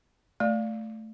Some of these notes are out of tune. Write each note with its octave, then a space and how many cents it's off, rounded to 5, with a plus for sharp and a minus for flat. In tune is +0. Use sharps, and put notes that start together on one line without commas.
A3 +0 D5 +0